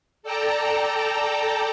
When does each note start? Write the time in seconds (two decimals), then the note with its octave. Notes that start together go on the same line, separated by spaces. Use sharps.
0.23 A4 D5 G5 A5 A#5